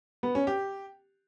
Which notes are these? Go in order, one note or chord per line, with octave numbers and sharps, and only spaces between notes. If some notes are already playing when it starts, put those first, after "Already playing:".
B3
C#4
G4